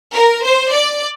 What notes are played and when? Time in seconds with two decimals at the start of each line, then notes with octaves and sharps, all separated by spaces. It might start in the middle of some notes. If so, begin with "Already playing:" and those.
0.14 A#4
0.43 C5
0.72 D5